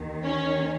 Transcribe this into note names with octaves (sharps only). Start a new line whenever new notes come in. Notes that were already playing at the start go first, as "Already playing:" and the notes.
Already playing: D#2 D#3
C#4 C#5